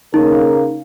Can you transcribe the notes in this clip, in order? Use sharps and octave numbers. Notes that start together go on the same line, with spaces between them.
C#3 A#3 D#4 A#4